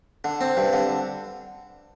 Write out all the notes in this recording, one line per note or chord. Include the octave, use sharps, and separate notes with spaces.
D3
C4
G2
D3